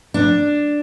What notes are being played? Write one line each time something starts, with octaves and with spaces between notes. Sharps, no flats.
D4